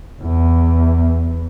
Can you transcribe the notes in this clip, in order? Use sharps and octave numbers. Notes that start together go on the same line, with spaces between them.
E2